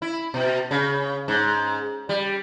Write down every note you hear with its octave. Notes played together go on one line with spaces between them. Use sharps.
E4
B2
C#3
G#2
G3